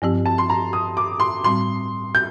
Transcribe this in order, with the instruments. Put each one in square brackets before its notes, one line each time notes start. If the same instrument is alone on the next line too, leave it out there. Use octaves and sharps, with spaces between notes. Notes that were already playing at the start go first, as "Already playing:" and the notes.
[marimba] G2 F3 C4 G4
[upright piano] A5
C6
A#5
D#6
D6
C6
[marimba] A2 G3 C4 [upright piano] C6
[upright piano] G6